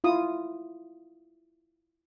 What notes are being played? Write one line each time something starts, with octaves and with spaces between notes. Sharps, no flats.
E4 F4 D#6